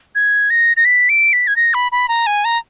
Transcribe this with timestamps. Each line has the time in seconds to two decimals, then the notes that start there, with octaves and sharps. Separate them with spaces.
0.15 G#6
0.50 A#6
0.77 A#6
0.85 B6
1.09 D7
1.33 B6
1.47 G#6
1.56 A#6
1.74 B5
1.92 B5
2.09 A#5
2.26 G#5
2.45 A#5